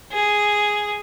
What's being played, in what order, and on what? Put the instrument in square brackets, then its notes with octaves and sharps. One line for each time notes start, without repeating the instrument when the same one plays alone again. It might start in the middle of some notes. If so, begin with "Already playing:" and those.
[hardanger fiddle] G#4